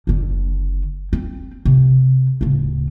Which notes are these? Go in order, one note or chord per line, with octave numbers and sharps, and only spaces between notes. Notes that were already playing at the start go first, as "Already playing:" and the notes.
F#1 D3
C4
C3
D1 C#3